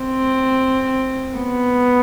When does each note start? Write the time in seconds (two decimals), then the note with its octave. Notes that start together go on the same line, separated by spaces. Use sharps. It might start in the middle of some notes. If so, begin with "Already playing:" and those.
Already playing: C4
1.37 B3